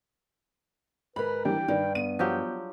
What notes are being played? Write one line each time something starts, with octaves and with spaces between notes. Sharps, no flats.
G#2 A#4 B4 B5
E3 G3 D4 G5
G2 D#3
B3 D#7
F3 F#3 G4